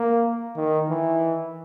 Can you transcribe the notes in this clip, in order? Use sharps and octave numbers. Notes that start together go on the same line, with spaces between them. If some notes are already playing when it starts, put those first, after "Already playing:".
Already playing: A#3
D#3
E3